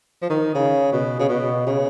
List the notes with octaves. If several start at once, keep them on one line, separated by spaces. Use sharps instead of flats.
F3
D#3
C#3
B2
C#3
B2
C#3